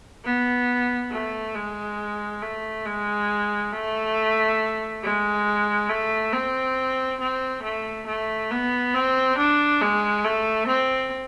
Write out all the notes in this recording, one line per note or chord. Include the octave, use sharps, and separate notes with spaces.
B3
A3
G#3
A3
G#3
A3
G#3
A3
C4
C4
A3
A3
B3
C4
D4
G#3
A3
C4